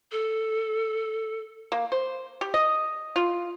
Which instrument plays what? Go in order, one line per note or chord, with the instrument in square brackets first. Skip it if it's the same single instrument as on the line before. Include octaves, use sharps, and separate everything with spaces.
[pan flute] A4
[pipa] A#3
C5
G4
D#5
F4